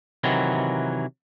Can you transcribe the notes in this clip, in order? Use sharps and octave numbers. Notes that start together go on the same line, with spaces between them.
C3 D#3 E3 F#3